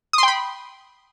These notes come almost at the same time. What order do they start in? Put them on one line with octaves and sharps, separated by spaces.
D#6 C6 G5 B5